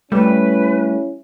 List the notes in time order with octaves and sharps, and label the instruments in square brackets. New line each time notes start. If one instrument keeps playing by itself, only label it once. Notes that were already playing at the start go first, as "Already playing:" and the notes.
[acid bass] G3 [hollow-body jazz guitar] A3 [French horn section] C#4 E4 [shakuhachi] B4